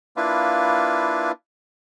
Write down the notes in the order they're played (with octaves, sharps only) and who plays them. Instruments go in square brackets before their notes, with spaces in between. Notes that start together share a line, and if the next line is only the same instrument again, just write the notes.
[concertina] A#3 D4 E4 F4 B4